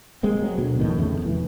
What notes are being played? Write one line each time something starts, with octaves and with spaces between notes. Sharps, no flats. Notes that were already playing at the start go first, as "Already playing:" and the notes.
G#3 A#3 C4
F#3
D2 B2
F2 A2 D#3
E2 C#3 A3
F1 E3